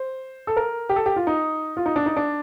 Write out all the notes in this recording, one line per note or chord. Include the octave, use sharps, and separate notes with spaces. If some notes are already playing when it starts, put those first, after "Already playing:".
Already playing: C5
A4
A#4
G4
A4
G4
F4
D#4
F4
D#4
D4
D#4
D4